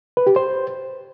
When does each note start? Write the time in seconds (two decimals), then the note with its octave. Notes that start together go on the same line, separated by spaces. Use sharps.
0.17 B4
0.27 G4
0.36 C5